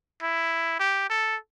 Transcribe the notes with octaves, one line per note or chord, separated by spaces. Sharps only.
E4
G4
A4